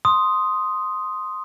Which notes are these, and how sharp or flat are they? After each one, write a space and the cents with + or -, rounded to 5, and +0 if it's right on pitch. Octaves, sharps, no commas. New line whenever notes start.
C6 +0 D#6 +0